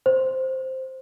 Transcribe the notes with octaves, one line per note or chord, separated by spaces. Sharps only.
C5